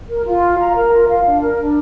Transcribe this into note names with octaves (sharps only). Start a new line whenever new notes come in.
A#4
F4
F5
A#5
A#4
F4
F5
D4
A#4
D4